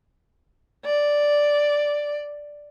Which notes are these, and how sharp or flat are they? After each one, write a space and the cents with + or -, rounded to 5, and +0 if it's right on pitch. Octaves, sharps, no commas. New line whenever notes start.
D5 +0